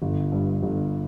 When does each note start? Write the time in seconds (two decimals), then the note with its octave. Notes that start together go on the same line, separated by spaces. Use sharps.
0.02 G1
0.32 G2
0.63 G1